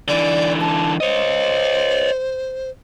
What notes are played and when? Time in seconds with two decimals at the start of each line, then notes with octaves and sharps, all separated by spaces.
0.08 D3 E3 D5
0.61 A5
1.00 C5 C#5 D#5